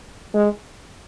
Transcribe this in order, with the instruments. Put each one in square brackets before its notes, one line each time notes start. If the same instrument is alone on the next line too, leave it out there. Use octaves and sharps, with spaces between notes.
[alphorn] G#3